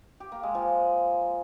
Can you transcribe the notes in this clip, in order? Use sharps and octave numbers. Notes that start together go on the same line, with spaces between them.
G4
A#3
G#3
F3